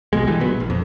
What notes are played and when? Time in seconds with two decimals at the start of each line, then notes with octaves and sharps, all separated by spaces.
0.13 A#1 D#2 B2 G#3
0.27 D3 E3 G3 G#3
0.40 A#2 F#3 B3
0.57 E1 A#1
0.70 F2